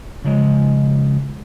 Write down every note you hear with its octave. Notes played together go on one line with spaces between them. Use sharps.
C#3 F3 G#3